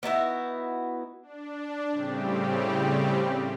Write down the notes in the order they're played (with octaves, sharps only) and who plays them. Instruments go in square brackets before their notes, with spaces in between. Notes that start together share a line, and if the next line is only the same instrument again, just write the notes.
[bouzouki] B3 D#4 E4 F#4
[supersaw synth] D4
A2 C#3 G3 C4 G4